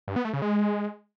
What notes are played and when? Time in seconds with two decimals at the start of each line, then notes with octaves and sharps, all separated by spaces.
0.08 G2
0.16 B3
0.25 A3
0.33 C#3
0.42 G#3